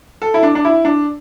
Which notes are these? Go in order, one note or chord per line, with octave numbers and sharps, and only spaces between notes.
A4
E4
D4
D4
E4
D4